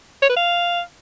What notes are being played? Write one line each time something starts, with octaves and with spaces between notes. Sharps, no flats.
C#5
B4
F5